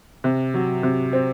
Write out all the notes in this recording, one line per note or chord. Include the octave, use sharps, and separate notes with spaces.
C3
F#3
C3
C4